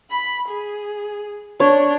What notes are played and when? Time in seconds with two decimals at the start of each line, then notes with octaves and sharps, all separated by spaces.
0.11 B5
0.49 G#4
1.60 D4 C#5